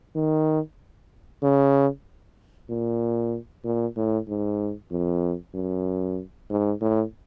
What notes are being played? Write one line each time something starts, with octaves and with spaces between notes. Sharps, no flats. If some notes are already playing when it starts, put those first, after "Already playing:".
D#3
C#3
A#2
A#2
A2
G#2
F2
F#2
G#2
A2